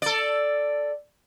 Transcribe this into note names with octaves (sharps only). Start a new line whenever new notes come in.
A4 D5